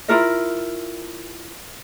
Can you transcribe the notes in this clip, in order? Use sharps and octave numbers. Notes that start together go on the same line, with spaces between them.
E4 F4 A#4 D#5